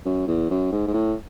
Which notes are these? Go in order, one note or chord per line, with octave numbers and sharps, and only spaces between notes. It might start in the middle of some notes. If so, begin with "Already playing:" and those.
F#2
E2
F#2
G#2
G#2
A2